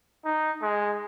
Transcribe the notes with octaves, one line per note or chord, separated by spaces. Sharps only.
D#4
G#3